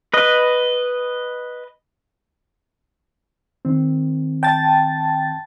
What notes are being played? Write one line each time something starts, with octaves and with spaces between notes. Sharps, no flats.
B4 D#5
D#3 C4
G5 A5 A6